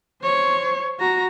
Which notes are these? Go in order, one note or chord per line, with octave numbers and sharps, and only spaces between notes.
C5 C#5
F#4 A#5